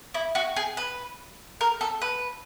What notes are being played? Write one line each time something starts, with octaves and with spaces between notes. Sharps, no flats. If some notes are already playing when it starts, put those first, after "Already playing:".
E4
F#4
G#4
B4
A#4
A4
B4